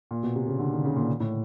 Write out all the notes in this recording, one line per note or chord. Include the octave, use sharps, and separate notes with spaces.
A#2
B2
C3
C#3
D3
D#3
C#3
A#2
A2